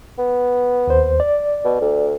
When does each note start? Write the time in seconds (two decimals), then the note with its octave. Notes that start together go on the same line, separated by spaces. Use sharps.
0.18 B3
0.87 D#2 C5
1.20 D5
1.64 B2
1.81 D2